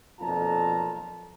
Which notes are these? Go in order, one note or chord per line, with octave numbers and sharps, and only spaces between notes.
B1 F2 A#2 F4 A5 A#5